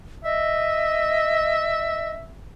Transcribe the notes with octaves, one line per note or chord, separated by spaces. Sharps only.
D#5 E5